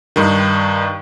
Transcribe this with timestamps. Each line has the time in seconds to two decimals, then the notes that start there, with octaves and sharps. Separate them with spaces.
0.16 G2 D#3